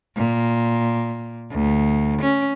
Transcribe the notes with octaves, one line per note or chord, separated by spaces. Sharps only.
A#2
D2
C#4